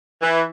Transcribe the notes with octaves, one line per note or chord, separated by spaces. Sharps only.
E3